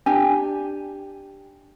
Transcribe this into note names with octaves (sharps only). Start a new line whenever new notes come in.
D4 G4 G#5